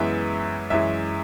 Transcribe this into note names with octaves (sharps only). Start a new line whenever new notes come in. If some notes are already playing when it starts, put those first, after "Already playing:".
Already playing: F#2 E3 G#3 B3 E5
F#2 E3 G#3 E5